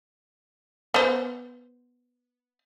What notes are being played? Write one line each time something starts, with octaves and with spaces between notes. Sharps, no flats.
B3 C5